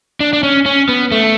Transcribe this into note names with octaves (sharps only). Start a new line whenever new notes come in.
D4
D4
C#4
C#4
B3
A3